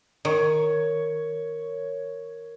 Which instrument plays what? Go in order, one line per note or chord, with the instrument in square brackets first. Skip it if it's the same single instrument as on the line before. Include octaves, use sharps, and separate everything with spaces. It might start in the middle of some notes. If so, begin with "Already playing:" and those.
[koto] D#3 [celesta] A#4 [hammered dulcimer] C#5